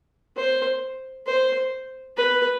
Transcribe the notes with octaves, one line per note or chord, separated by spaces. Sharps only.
C5
C5
B4